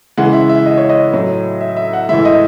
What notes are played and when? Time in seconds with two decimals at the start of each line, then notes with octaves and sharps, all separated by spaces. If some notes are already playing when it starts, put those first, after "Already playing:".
0.17 C#3 E3 G#3 F#5
0.33 E5
0.49 E5
0.66 D#5
0.77 C#5
0.89 D#5
1.13 A2 F#3
1.61 E5
1.77 E5
1.93 F#5
2.09 A2 E3 G#3 E5
2.25 D#5